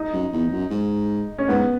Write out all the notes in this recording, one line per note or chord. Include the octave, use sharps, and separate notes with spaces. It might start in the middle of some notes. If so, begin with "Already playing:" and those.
Already playing: D#4
F#2
E2
E2
F#2
G#2
C#4
G#2 B3